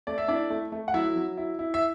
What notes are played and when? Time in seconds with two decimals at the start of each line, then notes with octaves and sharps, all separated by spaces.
0.07 A3 D5
0.18 E5
0.28 D4 E4 D5
0.50 A3
0.72 A3
0.88 F#5
0.94 F#3 E4 E5
1.16 F#3
1.37 E4
1.59 E4
1.74 E5